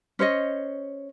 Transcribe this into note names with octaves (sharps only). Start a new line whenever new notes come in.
C#4 C5 C#5 D#5